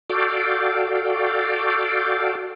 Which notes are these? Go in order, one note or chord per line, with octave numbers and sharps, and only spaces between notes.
F#4 A4 D5 F5 G5